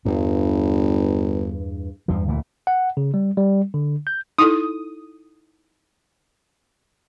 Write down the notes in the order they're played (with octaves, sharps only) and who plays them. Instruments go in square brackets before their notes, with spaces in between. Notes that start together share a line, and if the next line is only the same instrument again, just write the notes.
[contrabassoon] G1 [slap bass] E2 G2
[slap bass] E2 G2 F3
D2 A#2 E3
[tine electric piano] F#5
C#3
G3
G3
D3
G6
[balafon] D#4 E4 A4 [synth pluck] D#6